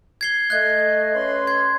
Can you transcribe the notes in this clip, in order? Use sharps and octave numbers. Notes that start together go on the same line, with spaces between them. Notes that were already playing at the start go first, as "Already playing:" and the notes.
G#6 C7 G7
A3 D#5 F#6 G#6
C#4 B4 C6
G#6